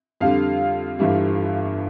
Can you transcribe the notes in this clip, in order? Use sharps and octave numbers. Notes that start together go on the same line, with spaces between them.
F2 D3 G3 F5
G1 G2 E3 G3